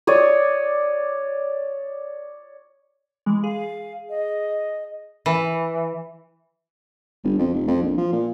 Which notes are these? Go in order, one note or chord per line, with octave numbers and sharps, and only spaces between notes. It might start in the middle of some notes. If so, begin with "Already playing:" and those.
C#5 D5 D#6
E3 G#3
G#4 F5
D#5
E3
G1
F2
F1
F2
A#1
F3
A#2